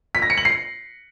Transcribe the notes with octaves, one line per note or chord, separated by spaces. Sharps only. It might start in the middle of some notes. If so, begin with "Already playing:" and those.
B6
A#6
C#7
F#7
C7